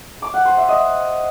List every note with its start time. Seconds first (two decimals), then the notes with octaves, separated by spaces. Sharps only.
0.22 D6
0.34 F#5
0.45 C5
0.57 E5
0.69 D#5